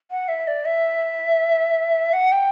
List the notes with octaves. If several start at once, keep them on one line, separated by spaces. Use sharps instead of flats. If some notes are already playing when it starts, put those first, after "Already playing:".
F#5
E5
D5
E5
F#5
G5